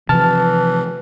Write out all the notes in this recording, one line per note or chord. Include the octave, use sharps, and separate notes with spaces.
C3 E3 F3 A5 F6